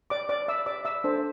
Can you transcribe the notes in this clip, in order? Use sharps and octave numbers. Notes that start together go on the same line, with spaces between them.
D5 D6
D5 D6
E5 E6
D5 D6
E5 E6
D4 A4 C5